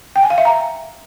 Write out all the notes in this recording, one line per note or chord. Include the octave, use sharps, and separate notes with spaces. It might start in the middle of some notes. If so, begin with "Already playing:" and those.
G5
G#5
F5
E5
A#5